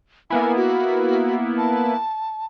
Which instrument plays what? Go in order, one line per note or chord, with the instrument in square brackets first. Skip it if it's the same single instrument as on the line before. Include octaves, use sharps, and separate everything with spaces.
[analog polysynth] A#3 B3 E4 [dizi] G#5
[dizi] F#4
A5